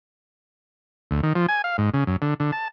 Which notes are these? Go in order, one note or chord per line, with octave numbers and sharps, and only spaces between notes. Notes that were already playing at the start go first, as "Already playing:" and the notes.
D2
D#3
F3
G#5
F5
G#2
C#3
F#2
D3
D3
A5